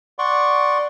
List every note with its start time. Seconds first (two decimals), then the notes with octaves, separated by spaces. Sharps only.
0.19 D5 F#5 C6 C#6